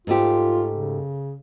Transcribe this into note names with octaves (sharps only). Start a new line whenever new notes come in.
G#2 A3 F4 G4
C#3